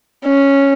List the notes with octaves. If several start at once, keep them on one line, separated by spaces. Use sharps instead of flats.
C#4